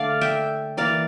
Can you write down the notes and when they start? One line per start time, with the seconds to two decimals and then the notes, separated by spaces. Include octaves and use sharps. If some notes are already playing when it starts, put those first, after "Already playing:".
Already playing: D3 A3 D5 F5
0.21 E5 G5
0.77 E3 A#3 D5 F5